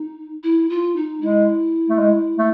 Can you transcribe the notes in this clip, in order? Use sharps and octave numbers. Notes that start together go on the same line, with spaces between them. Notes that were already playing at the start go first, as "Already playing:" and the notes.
Already playing: D#4
E4
F4
D#4
G#3 E4
A3
G#3
A3